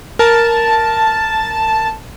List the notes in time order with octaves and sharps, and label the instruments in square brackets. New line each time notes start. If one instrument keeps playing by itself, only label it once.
[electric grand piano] A#4 [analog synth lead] A5